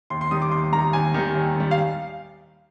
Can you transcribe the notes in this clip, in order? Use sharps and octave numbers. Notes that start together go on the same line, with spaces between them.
D#2 C6
C6
D#3 G3 D#6
D6
D#2 C6
D#3 G3 A#5
D#2 G#5
D#3 G3
D#2
D#3 G3
F5